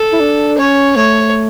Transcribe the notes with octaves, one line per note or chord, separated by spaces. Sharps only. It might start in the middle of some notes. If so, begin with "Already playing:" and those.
Already playing: A4
E4
D4
C#4 C#5
A3 C#5